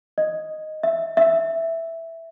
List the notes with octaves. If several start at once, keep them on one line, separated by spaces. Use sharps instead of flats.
D#5
E5
E5